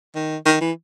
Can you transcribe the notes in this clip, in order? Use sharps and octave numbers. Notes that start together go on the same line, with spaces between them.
D#3
D#3
E3